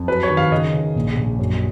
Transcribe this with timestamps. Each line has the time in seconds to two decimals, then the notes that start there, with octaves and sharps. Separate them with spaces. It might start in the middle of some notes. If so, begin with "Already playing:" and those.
Already playing: F2
0.08 F#3 B4
0.23 C#5
0.30 D#3
0.37 F5
0.52 C#3 D#5
0.74 C#3
0.96 A#1
1.17 A#1
1.39 F#2